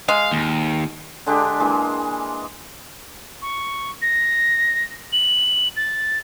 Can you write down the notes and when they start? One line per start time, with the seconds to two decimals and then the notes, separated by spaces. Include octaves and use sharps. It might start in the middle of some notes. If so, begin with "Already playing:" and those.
0.09 G#3 F5
0.31 D#2
1.26 D3 G#3 D4 G4
1.60 E3 G#3 A#3 D4
3.42 C#6
4.02 A#6
5.13 F#7
5.76 A6